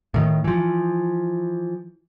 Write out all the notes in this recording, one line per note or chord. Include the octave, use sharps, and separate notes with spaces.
A2 D#3
E3 F3